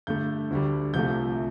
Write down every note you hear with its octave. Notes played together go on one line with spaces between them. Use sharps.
G2 D3 A3 G6
D2 D3 G3
C2 C3 F3 A3 G6